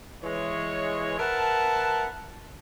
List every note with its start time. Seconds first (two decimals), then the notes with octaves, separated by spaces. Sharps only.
0.22 E3 G#3 C#5
1.18 A#4 B4 E5 F#5 A5